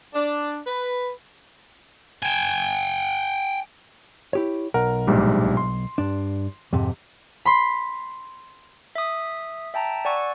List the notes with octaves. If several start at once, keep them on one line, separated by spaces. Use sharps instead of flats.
D4
B4
G5 G#5
E4 G4 C#5
B1 A#4 F#5
A#1 G#2 G3
C6
G2 D4
F2 G#2 C3
B5 C6
E5 D#6
E5 G5 A5 A#5
D5 F#5 G#5 C#6 E6 A6